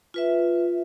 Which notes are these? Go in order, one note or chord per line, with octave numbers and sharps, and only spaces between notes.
F4 B4 E5